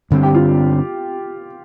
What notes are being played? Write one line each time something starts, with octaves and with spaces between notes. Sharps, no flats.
G2 D3 G3 C4
G4
F4